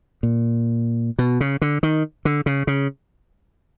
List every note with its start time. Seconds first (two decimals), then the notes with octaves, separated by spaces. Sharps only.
0.23 A#2
1.19 B2
1.40 C#3
1.62 D3
1.83 D#3
2.25 D3
2.46 C#3
2.67 C#3